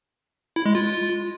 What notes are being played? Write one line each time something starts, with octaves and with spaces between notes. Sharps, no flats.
E4
G#3
F4